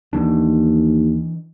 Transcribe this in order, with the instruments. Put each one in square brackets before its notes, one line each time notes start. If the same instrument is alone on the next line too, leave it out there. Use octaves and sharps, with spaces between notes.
[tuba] D#2 [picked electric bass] E3 D4